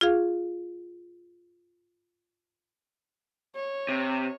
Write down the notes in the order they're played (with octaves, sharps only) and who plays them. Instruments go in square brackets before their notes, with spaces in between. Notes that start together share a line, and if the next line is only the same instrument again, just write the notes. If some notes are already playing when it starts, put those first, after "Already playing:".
[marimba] F4 G#4 F5
[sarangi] C#5
[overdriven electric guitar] C3